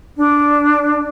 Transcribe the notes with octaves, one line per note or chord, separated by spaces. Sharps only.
D4